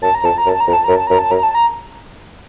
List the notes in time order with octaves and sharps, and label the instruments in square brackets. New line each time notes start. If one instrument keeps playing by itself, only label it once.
[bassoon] F#2 [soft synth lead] A5
[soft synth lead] A#5
[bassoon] F2 [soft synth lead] A5
[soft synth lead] A#5
[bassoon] F#2
[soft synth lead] A5
A#5
[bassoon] F2
[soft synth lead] A5
[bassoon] F#2 [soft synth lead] A#5
[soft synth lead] A5
[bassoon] F#2 [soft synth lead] A#5
[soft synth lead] A5
[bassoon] F#2 [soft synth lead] A#5
[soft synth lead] A5
A#5